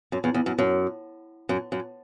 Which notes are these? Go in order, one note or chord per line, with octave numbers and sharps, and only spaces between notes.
F#2
E2
E2
F#2
F#2
F#2
F#2